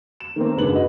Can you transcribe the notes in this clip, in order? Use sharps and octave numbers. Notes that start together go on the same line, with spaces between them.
E7
D#3 A3 A#3 C4
F#1 G#2 D4 G#4 B4 F#7
F#4 B4 D#5